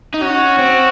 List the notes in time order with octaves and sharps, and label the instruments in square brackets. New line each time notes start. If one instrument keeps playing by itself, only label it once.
[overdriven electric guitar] D#4
[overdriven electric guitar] C#4 [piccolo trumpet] F#4
[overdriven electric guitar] C4